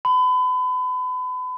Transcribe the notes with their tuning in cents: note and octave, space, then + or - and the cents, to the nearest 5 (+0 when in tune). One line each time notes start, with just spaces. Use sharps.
B5 +35